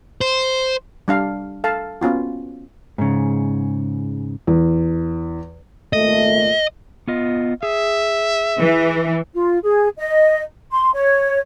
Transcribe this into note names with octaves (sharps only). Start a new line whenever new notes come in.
C5
G3 D4 F5
A4 F5 A5
B3 C#4 F4 F#4
G#2 C#3
E2
G#1 A#2 A3 D#5
B3 F4 D#5
G#4 E5
E3
F4
G#4
D#5
C6
C#5